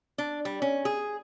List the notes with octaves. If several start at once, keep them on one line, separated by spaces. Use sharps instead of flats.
D4
G3
C#4
G#4